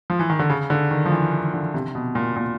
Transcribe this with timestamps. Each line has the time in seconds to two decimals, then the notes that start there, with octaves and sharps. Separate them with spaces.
0.10 F3
0.19 E3
0.30 D#3
0.39 D3
0.50 C#3
0.70 D3
0.91 D#3
1.06 F3
1.12 E3
1.33 E3
1.54 D3
1.74 C3
1.95 B2
2.15 A#2
2.36 A#2